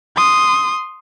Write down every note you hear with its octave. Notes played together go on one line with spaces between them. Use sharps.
C6 D#6